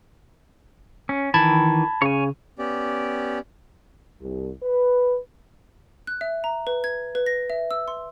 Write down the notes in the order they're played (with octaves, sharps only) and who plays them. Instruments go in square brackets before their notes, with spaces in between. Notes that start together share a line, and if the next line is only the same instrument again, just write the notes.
[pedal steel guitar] C#4
[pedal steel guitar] D#3 E3 [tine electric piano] A5 B5 G#6
[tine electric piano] C#3 [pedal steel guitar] C#5 G#5
[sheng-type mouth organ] B3 C#4 G4 D5
[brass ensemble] C2
B4
[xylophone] F#6
E5
A#5
B4
G#6
B4
A#6
E5
E6
C6